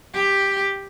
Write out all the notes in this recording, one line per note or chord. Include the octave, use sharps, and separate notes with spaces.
G4